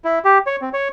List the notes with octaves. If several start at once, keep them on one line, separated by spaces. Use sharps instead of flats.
E4
G4
C#5
C4
C#5